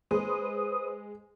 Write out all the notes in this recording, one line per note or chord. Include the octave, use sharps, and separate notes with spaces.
G#3 B4 C5 D#6